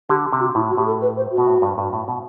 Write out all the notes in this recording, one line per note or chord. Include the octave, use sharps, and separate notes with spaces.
D3 G4
C3
F#4
A2 E4
F#4
A2 G4
A4
B4
C5
F#4
B2
A2
G2
G2
A2
B2